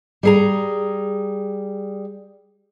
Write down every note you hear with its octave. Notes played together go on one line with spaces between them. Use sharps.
G3 G#4 A#5